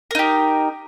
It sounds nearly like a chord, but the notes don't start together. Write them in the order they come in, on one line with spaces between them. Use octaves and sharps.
A#4 D#4 G4